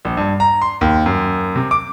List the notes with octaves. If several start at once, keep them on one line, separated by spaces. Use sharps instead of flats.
A#1
G2
A#5
C6
D#2
F#2
C3
D6